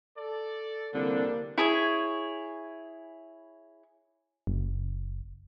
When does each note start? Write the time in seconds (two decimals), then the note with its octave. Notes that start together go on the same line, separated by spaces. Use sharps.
0.17 A4 D5
0.94 C2 D3 F3 G3 A#3 D4
1.58 E4 G#4 C#5
4.47 F#1